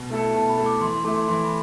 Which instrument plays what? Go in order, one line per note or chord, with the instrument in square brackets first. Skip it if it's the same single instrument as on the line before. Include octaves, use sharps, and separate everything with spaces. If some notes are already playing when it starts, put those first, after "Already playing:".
Already playing: [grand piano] B2
A3 E4 A4
[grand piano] B2 [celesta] A5
[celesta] B5
[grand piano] A3 E4 A4
[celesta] D6
[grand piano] E3 [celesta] C6
[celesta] C6
[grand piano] A3 E4 [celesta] D6
[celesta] C6
[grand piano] E3 [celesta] C6
[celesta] B5